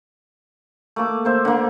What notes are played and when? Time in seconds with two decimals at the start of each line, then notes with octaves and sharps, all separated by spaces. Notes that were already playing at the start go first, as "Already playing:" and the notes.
0.96 A3 A#3 D6
1.25 A#3 C5 E5
1.45 D3 A#3